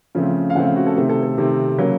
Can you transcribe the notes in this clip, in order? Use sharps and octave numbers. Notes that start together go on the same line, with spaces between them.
C#3 F3 A3 C4
F5
C#3 F3 A3 C4 F#5
F5
F#4
A4
C3 D#3 A3 C4
A4
A4
C3 D#3 A3 C4
C#3 F#3 A#3